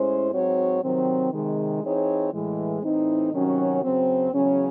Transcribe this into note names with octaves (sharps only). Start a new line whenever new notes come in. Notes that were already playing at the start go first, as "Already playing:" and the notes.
Already playing: A2 G#3 C#4 E4 C5
G#2 F#3 C4 F#4 C#5
C3 D#3 F#3 C4
C3 D#3 G#3
E3 C4 D#4 G#4 C#5
A2 E3 G#3
A2 E3 C4 D#4
C3 D#3 F#3 C#4 F#4
F#2 C#3 F#3 C4
E2 C#3 F#3 C#4